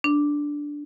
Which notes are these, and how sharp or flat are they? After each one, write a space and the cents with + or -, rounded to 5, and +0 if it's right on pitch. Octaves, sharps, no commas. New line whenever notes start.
D4 -5